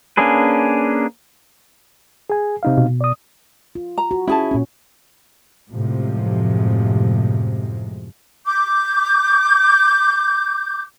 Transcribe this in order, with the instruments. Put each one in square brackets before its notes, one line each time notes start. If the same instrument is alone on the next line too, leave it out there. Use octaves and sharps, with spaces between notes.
[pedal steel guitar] A#3 C#4 D4 G#4 B4
[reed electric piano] G#4 G#5
C3 D#4 F5
[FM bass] B2
[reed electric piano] D5 D#6
[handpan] F4
[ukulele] A#5
[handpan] F#4
[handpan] C#4 [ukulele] E4 G#4 A5
[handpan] A#2 C#4
[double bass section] F#2 A2 C3 F3 G#3
[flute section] D6 G6